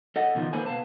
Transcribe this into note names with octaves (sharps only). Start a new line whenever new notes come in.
A4 D#5 F#5
B2 D3 D#3 F3
A#3 A4 B4 C5 G#5
B2 B4 F5 A5